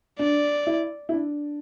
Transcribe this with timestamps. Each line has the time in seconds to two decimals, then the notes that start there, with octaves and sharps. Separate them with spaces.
0.19 D4 D5
0.67 E4
1.09 E4
1.13 D4